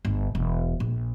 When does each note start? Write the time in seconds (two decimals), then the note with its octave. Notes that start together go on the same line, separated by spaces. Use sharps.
0.05 G1
0.35 E1
0.80 A#1